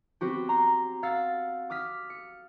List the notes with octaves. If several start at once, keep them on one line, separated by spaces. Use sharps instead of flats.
B3 C4 F#4 G4
A#5 C6
F5 F#5 E6 A6
D6 D#6 F6 B6
C#7